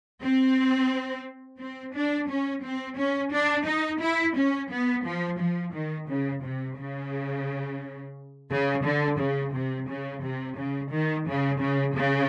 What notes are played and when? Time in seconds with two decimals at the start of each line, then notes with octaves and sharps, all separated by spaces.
0.22 C4
1.59 C4
1.94 D4
2.29 C#4
2.64 C4
2.97 C#4
3.32 D4
3.66 D#4
4.01 E4
4.36 C#4
4.71 B3
5.04 F3
5.39 F3
5.73 D#3
6.08 C#3
6.43 C3
6.77 C#3
8.50 C#3
8.84 D3
9.18 C#3
9.53 C3
9.88 C#3
10.23 C3
10.56 C#3
10.91 D#3
11.27 C#3
11.60 C#3
11.95 C#3